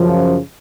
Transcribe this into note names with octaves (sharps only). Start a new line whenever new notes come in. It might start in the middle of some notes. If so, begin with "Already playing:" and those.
Already playing: F#2 C#3 F3